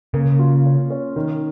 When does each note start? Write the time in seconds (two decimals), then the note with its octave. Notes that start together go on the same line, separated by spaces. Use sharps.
0.14 C#3 A#3
0.39 F4
0.65 C#4
0.90 C#4
1.16 D#3